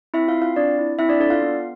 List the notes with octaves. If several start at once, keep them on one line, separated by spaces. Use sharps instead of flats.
C4 E4 E5
F4 F5
C4
F4 F5
C4 D4 D5
E4
C4 E4 E5
D4 D5
D4 A4 D5
F4 F5
B3